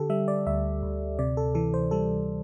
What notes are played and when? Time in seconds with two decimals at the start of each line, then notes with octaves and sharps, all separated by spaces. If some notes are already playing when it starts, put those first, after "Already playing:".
Already playing: D3 G4 A4
0.10 G3 E5
0.28 D5
0.46 D2 E5
0.83 D2
1.19 C3 D5
1.37 A4
1.55 E3 A4
1.74 C5
1.91 G3 A4